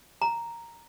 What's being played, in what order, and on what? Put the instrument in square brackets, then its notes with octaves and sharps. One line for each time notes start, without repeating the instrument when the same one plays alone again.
[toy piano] A#5